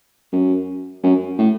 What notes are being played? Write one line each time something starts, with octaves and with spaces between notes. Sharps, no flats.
F#2
F#2
A2